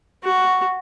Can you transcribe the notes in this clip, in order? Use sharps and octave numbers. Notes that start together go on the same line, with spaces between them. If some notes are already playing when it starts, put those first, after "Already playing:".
F#4